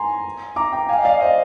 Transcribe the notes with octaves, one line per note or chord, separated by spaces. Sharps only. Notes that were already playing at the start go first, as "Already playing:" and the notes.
Already playing: G#5 A#5 C6
A#5 D6
G5 A#5
F5 G#5
D#5
D5 F5
C5 D#5